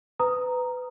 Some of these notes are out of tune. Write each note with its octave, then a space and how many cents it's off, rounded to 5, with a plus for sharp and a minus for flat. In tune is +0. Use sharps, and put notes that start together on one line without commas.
B4 +25 A#5 +0 D#6 +0